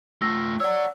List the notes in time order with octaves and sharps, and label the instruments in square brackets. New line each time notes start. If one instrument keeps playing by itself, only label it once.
[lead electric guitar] A3 F4 [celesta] E6 A#6
[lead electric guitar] C#5 F#5 [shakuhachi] D5 [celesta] E6